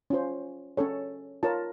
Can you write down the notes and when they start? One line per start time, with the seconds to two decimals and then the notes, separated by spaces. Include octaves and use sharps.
0.10 C#4 F4 C5
0.77 C#4 A4 C#5
1.43 F4 A#4 C#5 A5